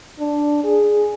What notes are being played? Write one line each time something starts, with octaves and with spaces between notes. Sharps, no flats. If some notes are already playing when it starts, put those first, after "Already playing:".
D4
G#4